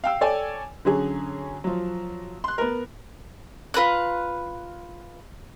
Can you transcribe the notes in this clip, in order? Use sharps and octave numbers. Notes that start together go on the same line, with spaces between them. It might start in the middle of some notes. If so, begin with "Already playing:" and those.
F5 G5 E6
A4 C#5 D5 G5 G#5
D3 F#3 C#4 G#4
F3 F#3
C6 F#6
B3 A#4
F4 B4 A#5 F#6